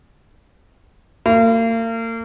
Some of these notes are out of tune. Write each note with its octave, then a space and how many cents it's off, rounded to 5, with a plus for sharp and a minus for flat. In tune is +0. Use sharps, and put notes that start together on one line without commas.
A#3 -40